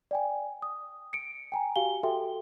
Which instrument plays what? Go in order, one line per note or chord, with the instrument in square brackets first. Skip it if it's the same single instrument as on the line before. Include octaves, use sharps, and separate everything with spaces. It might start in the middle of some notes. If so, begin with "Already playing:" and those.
[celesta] D5 G5 G#5
D#6
C#7 D7
G5 G#5 A#5
F#4 G4 F5 G#5 G7
F#4 A4 E5 G5 C6